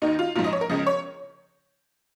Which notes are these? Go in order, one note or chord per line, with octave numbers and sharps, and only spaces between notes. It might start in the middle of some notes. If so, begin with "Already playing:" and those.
D#2 D#3 D#4
F4
A#1 G#2 F3 F4
D#5
C#5
A#4
C#2 C#3 F3 D#5
C#5